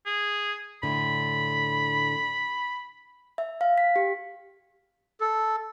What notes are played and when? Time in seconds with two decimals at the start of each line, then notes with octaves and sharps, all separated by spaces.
0.06 G#4
0.83 A2 D3 B5
3.38 E5
3.61 F5
3.78 B6
3.96 G4
5.20 A4